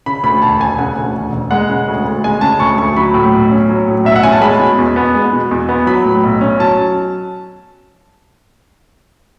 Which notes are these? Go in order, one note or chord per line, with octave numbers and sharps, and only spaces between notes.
C#3 B5
D2 B5
E1 A5
E1 G#5
C#3 F#5
D2
E1
E1
G#3 F#5
C#3
D2
D2
G#3 G#5
C#3 A5
D2 C#6
D2 C#6
F#3 B5
A2
B1
C#4
F#3
A2
B1 E5
F#5
C#4 G#5
A5
G#3 B5
B2
E2
B3
G#3
B2
E2
B3
F#3 B5
A2
B1
C#4
F#3 A5